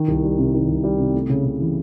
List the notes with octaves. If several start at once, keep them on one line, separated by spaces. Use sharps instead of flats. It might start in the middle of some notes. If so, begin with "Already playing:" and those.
Already playing: D#3
C2
G3
C3
D#3
C2
G3
C3
A3
C#3
C#3
E3